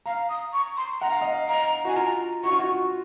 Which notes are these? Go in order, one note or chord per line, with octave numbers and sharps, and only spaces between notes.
F5 A#5
D#6
C#6
C6
F#5 A#5
F5
D#5
F5
D#5 A#5
F#4 G#5
F4 A#5
F#4 C#6
F4
F#4